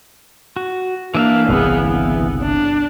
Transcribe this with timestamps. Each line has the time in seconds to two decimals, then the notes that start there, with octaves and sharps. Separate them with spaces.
0.56 F#4
1.15 E3 A#3 D4 E5 F5
1.49 G1 C2 C#3 B3 G#4
1.88 B3
2.41 D4